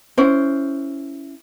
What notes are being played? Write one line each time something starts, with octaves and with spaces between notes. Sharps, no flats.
C#4 E4 C5